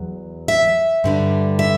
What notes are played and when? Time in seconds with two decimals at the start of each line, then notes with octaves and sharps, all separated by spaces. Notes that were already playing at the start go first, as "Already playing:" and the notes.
Already playing: E2 F#3
0.48 E5
1.04 G2 D3 G3
1.59 E5